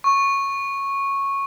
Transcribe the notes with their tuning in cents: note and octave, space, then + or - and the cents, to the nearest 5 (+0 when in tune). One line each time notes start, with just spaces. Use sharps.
C#6 -10